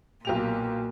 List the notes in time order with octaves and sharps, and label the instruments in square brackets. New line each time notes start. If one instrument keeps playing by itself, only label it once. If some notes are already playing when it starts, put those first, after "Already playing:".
[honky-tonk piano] B1 G4 F7 [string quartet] A#2